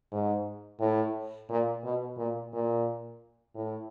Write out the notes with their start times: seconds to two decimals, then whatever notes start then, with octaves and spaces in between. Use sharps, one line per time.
0.12 G#2
0.80 A2
1.49 A#2
1.84 B2
2.18 A#2
2.53 A#2
3.55 A2